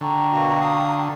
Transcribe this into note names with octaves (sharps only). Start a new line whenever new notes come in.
D3 G5 A#5 C#6
B2 A#3 F#4
F5 D#6